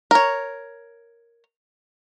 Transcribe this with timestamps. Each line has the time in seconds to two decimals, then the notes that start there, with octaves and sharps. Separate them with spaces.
0.11 A#4 C#5